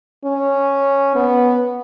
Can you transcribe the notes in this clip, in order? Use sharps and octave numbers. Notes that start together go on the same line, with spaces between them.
C#4
B3